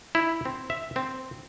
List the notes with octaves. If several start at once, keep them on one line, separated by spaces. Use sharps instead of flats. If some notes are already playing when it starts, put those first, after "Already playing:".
E4
C4
E5
C4